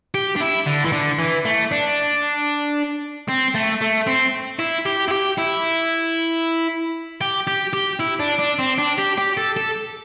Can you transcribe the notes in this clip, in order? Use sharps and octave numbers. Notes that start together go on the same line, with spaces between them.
G4
D4
E4
D3
E3
D3
E3
A3
D4
C4
A3
A3
C4
E4
G4
E4
G4
E4
G4
G4
G4
E4
D4
D4
C4
D4
G4
G4
A4
A4